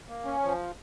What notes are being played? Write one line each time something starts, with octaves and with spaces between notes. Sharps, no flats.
A#3
C#4
F3